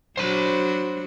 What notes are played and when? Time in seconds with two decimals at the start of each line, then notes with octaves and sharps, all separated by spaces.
0.18 F#3 D4 F#4 C5 B5